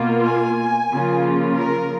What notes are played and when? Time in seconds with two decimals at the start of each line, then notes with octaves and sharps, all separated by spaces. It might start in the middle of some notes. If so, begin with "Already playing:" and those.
Already playing: B2 A#3 F4
0.27 G#5
0.92 C#3 F3 A#3 F4
1.56 A#4